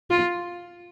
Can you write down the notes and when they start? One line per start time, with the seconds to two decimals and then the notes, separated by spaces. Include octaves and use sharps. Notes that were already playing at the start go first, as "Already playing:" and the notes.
0.10 F4